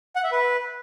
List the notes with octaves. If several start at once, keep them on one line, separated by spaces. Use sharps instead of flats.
F#5
E5
B4